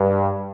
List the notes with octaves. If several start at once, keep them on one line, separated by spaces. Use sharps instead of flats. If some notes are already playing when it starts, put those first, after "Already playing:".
Already playing: G2